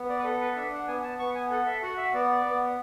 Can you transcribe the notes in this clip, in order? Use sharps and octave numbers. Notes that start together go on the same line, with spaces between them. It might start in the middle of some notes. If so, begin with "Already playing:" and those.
Already playing: B3
D5
B4
A4
B4
D4 E5
F#5
B3 G#5
A5
B3 C#6
G#5
A4 F#5
E5
F#4 F#5
E5
B3 D5
B3